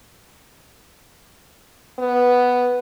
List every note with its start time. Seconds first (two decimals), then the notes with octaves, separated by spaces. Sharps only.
1.99 B3